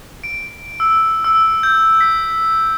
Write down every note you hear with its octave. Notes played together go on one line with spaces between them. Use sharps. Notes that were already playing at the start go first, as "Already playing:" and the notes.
D7
E6
E6
G6
B6